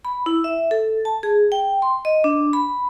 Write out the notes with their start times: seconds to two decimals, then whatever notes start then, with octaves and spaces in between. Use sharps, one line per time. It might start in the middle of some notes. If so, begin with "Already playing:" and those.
0.05 B5
0.26 E4
0.44 E5
0.71 A4
1.05 A5
1.23 G#4
1.52 G5
1.82 C6
2.05 D#5
2.24 D4
2.53 B5